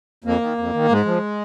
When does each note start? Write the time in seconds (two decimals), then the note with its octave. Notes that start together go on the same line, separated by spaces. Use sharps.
0.24 F2 A#3
0.41 D#3
0.58 F2
0.74 D#3
0.89 G#2 G#3
1.06 F3